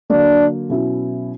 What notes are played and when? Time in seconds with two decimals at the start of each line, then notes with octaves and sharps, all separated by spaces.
0.10 D3 F#3 A#3 D4
0.70 B2 F#3 C#4 E4